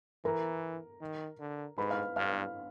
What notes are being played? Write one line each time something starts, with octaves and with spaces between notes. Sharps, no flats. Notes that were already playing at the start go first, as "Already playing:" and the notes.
E3 A#4 A#5
D#3
D3
G#2 B4 B5
F5 F6
G2 F5 F6